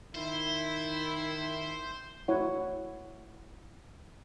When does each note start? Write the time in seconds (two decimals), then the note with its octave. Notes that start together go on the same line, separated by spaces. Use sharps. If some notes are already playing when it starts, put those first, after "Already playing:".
0.15 D#3 E4 C5
2.28 E4 C#5 F#5